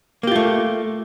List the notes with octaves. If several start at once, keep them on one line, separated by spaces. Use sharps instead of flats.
A3 A#3 F4 G4